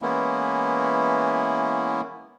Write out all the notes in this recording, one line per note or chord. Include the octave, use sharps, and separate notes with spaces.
E3 G#3 A#3 B3 C#4 E4